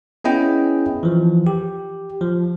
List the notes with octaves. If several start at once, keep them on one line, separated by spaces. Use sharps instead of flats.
B3 C#4 E4 G#4 D#5 G5
E3 F3
G4
F3